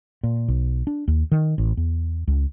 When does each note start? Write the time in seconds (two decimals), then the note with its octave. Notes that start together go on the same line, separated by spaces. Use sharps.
0.23 A#2
0.48 B1
0.87 D4
1.08 D#2
1.32 D#3
1.58 A1
1.77 E2
2.28 C#2